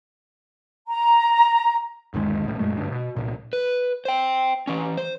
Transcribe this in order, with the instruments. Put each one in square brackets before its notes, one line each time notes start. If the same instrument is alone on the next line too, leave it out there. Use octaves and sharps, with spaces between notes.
[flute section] A#5
[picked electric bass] G1 D#2 D#3 G#3
B1 A2
F#2 A#2 G#3 A3
D2 G2 D4
B2
C2 A#2
[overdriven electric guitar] B4
C5 G5
E3 C#4
C5